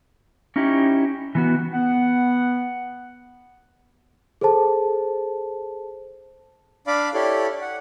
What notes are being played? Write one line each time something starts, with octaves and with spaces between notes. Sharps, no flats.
C#4 D#4 E4 G4
E3 B3 F#4
B3 F#5
G#4 A4 C5 A5
D4 D5 F5 B5 D6
E4 G4 A4 C#5 D5
F#5